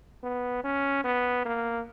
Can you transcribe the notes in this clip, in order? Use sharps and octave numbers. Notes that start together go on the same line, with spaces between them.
B3
C#4
B3
A#3